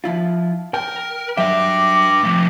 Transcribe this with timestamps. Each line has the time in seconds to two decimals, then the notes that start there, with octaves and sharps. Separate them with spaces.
0.04 F3 E4 F4
0.74 A#4 G5
1.37 G2 F#3 D4 E5 G5 D6
2.24 F3 A3